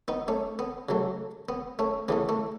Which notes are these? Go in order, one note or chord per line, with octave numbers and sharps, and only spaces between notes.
B3 D#4
A3 C#4
B3
C#3 F#3 A3
B3
A3 C#4
C#3 E3 A3 B3
A3